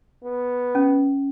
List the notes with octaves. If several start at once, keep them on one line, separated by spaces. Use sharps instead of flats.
B3
C#4